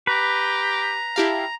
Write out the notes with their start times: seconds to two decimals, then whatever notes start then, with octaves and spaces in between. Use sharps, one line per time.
0.07 G4 B4 A#5
1.16 E4 G4 F5 A5